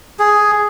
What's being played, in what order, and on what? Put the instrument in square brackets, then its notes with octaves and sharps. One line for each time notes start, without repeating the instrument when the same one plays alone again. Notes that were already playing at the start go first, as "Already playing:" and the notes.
[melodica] G#4